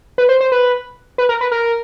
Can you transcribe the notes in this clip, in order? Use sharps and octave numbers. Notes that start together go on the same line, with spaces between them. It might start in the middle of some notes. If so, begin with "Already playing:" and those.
B4
C5
C5
B4
B4
A#4
B4
A#4